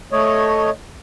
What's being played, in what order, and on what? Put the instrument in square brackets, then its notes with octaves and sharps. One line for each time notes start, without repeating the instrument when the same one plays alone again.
[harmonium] A3 C#5 D#5